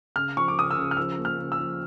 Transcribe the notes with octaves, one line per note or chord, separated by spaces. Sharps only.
C#3 F6
F3 C#6
D6
C#3 D#6
E6
C#3
F6
F3 E6
A#3
F6
C#3
E6
F3